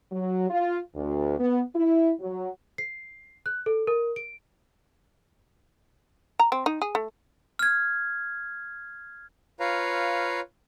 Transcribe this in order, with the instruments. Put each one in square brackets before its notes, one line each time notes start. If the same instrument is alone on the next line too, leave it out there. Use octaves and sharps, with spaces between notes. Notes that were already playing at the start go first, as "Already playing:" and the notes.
[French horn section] F#3
F4
D2
B3
E4
F#3
[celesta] C7
F#6
A4
A#4
D7
[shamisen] A#5
C4
D#4
G#4
A3
[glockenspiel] F6 G#6
[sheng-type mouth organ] F4 B4 C#5 F5 A#5